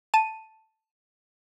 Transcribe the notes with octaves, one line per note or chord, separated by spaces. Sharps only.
A5 D#7